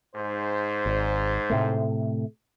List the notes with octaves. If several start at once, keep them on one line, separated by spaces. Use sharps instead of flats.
G#2 C5
G#1
A2 C3 A3